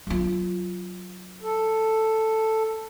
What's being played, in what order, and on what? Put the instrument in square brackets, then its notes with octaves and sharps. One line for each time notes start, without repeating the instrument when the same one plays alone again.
[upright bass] F#3 F4
[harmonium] A4